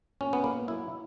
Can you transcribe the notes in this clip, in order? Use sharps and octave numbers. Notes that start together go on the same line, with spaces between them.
A#2 C#4
B3
A#2 A#3
F#3 E4